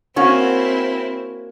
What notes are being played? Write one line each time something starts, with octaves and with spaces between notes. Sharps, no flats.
A#3 C4 C#4 E4 F#4